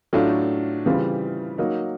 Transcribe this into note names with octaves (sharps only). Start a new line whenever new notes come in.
A2 F#3 A3 D4 F4
C#3 E3 G3 C4 F4
F#3 A#3 D#4